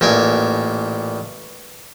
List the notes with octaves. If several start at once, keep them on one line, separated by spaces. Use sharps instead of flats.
A1 A#2 G5 G#5